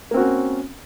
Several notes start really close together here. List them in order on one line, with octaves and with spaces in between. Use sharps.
A#3 C4 F#4 C#4